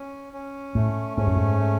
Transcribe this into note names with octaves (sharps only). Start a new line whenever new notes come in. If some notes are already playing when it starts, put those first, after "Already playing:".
Already playing: C#4
C#4
A2 A3
G#2 C#4
F#2
G#2
A3